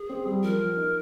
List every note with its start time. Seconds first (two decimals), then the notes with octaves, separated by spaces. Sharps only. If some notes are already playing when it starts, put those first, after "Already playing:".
Already playing: G#4
0.09 C4
0.26 G3
0.42 F3 A#4
0.60 F3
0.77 D#4